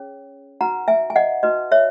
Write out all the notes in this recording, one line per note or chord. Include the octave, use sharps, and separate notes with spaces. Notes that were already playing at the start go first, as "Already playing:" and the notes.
Already playing: C#4 G#4 C#5
D#4 F#4 B4 F#5 A#5
E5 G#5
G#5
D#5 F#5
D#4 F#4 B4 D#5
C#5 E5